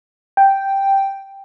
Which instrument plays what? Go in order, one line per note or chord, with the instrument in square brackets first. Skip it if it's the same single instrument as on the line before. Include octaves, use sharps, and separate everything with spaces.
[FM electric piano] G5